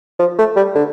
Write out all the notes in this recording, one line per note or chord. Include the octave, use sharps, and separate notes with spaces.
F3
A3
G3
D3